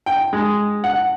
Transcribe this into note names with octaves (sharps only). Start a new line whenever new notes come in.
G5
G#3
F#5